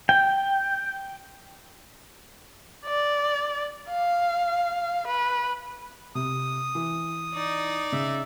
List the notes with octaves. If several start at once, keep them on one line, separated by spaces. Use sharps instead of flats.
G5
D5
F5
B4
C3 D#6
E3
D#4 D5
C#3 E5